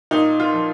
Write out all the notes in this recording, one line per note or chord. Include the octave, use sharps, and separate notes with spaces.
A#2 D#4
F4
F3